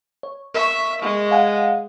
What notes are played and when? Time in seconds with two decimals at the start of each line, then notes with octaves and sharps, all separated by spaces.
0.23 C#5
0.54 A#4 E5 C#6
1.02 G#3
1.31 F5 F#5 G#5